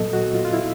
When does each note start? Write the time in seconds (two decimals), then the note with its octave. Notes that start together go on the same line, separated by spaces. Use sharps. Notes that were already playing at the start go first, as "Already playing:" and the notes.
Already playing: A#2 F#3 B3 A4 D#5
0.13 F#4
0.34 F4
0.45 F4
0.53 E4